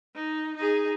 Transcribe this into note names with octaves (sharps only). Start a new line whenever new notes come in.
D#4
D#4 G#4